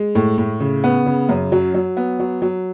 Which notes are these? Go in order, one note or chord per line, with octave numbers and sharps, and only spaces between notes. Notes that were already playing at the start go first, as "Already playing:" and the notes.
Already playing: G#3
A2
A2
C#3
B3
C#3
F#2
F#3
F#3
B3
F#3
F#3